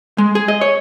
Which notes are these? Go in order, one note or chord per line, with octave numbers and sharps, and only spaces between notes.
G#3
G#4
D#5
C#5